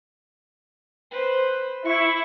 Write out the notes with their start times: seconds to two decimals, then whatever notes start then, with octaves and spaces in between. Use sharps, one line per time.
1.11 B4 C5
1.85 E4 C#6